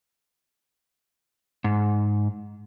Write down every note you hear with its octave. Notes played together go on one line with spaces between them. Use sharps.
G#2